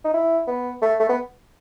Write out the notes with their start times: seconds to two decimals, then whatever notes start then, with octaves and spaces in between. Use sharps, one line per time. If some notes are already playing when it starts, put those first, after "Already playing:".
0.05 D#4
0.14 E4
0.48 B3
0.82 A3
1.00 A3
1.09 B3